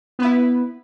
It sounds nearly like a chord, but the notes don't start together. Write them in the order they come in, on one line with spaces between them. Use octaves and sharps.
B3 B4 E4